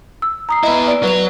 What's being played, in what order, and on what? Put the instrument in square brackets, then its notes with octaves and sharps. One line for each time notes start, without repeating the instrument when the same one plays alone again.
[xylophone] E6
A#5 D#6 C7
[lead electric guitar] B3 E4 [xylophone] D#5 B5
[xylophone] D5 D7
[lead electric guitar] F#3 [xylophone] B4 F7